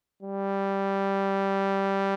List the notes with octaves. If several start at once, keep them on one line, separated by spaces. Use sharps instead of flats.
G3